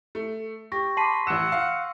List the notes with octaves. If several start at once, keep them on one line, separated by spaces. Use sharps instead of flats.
A3
G4 C#6 A#6
A5 B5 C6 D6 C7 D#7
A1 F#5 E6 E7
F5